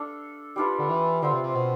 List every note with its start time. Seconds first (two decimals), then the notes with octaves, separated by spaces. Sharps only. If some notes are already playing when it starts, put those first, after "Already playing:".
Already playing: D4 A4 D5 F5
0.56 G3 D4 F4 B4
0.79 D3
0.89 E3
1.22 D3 F3 C4 F4
1.33 C3
1.43 C3
1.54 B2